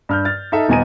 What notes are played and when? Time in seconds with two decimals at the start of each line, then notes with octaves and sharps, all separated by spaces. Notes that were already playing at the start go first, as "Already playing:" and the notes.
0.09 G2 F6 G6
0.25 F6 A6
0.52 D#4 A4 E5
0.68 D#1 B3 D#5 G#5 A#5 D#7